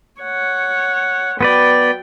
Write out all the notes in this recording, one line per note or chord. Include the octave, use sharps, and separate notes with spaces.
C#5 F#5
F#3 B3 B4 D5 G5